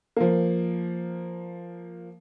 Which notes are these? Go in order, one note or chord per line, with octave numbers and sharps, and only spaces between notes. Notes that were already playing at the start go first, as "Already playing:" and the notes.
F3 A#3